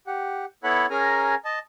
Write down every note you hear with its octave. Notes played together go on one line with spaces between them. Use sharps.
G4 F#5
B3 E4 A4 C#5 F#5 B5
C#4 G#4 A#4 G#5 A#5
D#5 A5